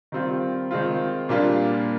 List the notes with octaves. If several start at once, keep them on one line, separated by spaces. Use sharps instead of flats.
D#3 G3 C4 F4
D#3 G#3 C4 F4
A#2 G3 A#3 D4 F4